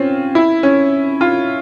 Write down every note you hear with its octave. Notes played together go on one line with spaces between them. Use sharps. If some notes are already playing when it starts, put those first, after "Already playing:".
Already playing: C4 C#4 F4
E4
C#4
F4